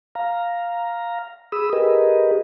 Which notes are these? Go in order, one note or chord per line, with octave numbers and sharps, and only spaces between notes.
F5 A#5
G#4 B5 D#6 E6
G4 G#4 A#4 B4 D#5